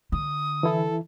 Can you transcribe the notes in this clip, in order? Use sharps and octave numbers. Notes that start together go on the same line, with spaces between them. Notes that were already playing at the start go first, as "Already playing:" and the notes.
D3 D#6
E3 E4 A4